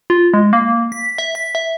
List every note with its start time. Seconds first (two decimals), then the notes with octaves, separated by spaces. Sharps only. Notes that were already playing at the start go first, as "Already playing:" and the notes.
0.10 F4
0.34 G#3
0.53 A#3
0.92 B6
1.18 E5
1.35 B6
1.55 E5